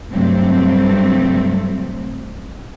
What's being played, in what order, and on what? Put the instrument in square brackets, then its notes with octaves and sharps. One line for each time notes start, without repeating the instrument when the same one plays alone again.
[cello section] G2 C3 F#3 A3 C4